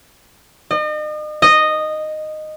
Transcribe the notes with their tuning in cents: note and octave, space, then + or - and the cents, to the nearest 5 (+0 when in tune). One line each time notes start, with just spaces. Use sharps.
D#5 -40
D#5 -10